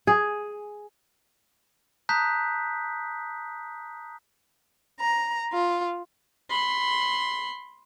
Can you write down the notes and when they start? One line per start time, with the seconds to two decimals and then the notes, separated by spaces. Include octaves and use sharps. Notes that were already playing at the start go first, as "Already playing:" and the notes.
0.07 G#4
2.09 A5 A#5 D#6 F#6 G6 B6
4.99 A#5
5.54 F4
6.50 B5 C6